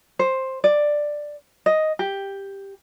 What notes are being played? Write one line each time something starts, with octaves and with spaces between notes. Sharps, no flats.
C5
D5
D#5
G4